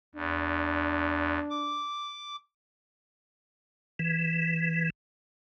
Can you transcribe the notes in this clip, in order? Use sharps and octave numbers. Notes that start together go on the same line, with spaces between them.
E2 D4
D6
E3